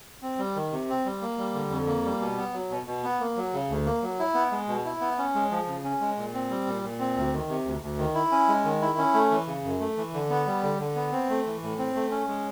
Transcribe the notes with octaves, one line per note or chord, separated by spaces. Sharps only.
C4
G3
D#3
C3
C4
G3
A#3
G3
D3
F2
A#3
G3
B2
B3
F#3
B2
B2
B3
A#3
F#3
C#3
D2
A#3
F#3
E4
B3
G#3
B2
E4
B3
C#4
G#3
F3
C#3
C#4
G#3
A#2
C4
G3
A#2
A#2
C4
D2
D#3
C3
D2
D2
D#3
E4
C#4
G#3
D#3
E4
C#4
A3
E3
C#3
F#2
A3
E3
D3
B3
G3
D3
D3
B3
C4
A3
E3
A2
C4
A3
C#4
G#3